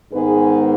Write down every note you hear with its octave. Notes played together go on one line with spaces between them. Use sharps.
G#2 D#3 G#3 B3 G#4 B4